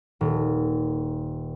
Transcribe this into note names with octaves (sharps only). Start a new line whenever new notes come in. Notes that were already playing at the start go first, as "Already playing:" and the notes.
D#1